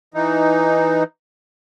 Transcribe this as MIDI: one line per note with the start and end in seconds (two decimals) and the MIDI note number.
0.14 1.03 52
0.14 1.03 63